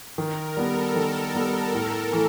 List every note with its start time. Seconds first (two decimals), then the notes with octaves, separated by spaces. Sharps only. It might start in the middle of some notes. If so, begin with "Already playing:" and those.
0.17 D#3 A#4
0.57 G3 B3 A4
0.96 D#3
1.34 G3 B3
1.73 A2
2.12 E3 A3